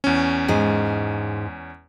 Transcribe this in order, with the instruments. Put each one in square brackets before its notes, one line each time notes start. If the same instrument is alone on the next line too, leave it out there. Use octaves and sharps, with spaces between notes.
[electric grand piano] E2 C#4
[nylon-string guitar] G#2 G#4